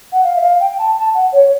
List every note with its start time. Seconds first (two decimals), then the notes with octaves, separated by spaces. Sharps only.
0.12 F#5
0.24 F5
0.36 E5
0.41 F5
0.60 G5
0.78 A5
0.97 A5
1.14 F#5
1.32 C#5